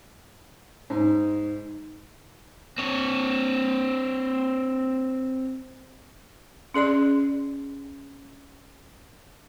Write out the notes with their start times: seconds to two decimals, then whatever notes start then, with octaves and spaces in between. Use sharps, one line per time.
0.90 G#2
2.78 C4 C#5
6.74 C#4 G#4 D5 C6